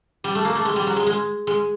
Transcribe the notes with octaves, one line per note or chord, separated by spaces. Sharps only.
G3
A3
A#3
A3
G#3
G3
F#3
G#3
G#3
G#3